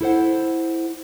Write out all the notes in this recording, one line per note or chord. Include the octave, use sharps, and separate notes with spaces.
E4 A4 C5 F#5